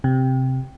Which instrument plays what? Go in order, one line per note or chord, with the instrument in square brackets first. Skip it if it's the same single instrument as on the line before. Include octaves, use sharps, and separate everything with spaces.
[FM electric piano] C3